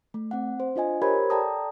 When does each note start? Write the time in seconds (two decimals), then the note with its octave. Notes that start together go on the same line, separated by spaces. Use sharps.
0.14 A3
0.31 C4 F#5
0.60 C5
0.76 D4 F4 D#5 G#5
1.02 G4 A#4 C5 C#5 B5 G#6
1.30 A4 D5 G5 A5 A#5 D#6